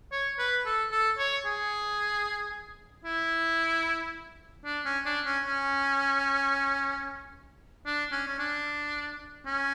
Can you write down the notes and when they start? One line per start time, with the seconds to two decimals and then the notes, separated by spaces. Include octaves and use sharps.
0.12 C#5
0.39 B4
0.66 A4
0.92 A4
1.18 C#5
1.46 G#4
3.05 E4
4.65 D4
4.85 C#4
5.06 D4
5.26 C#4
5.45 C#4
7.86 D4
8.12 C#4
8.27 C#4
8.39 D4
9.46 C#4